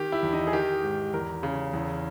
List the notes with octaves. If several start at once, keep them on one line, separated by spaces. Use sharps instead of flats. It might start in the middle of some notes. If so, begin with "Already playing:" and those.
Already playing: D#3 G4
E4
E2
D#4
G#4
D#3 G4
G#2
E2 A#4
C#3
E2